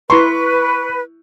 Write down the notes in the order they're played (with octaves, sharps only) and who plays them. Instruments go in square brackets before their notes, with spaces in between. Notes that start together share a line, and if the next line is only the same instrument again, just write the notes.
[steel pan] E4 A#5 C6 [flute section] B4 [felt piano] C#6